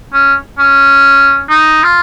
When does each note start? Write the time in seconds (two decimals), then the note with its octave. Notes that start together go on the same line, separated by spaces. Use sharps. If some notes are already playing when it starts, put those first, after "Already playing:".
0.13 C#4
0.59 C#4
1.49 D#4
1.83 F4